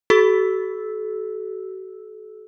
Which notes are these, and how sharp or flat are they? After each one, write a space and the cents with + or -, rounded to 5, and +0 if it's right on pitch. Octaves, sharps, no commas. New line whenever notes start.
F#4 +35 A4 -35 E6 -5